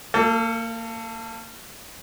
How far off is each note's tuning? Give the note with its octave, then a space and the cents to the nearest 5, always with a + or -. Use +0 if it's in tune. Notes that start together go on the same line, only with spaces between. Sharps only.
A#3 -30 A4 +20